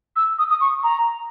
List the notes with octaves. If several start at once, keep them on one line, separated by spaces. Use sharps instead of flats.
E6
D#6
D#6
C#6
A#5